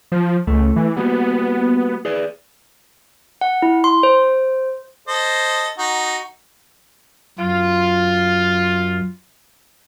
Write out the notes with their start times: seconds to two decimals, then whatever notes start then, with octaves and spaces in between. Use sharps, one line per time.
0.12 F3
0.47 C#2 A3
0.76 E3
0.96 G3 A#3 B3 F#4
2.05 G#4 B4 D5
3.41 F#5
3.62 E4
3.84 C6
4.03 C5
5.08 A4 C5 D#5
5.78 D#4 F#4
7.38 F#2 F4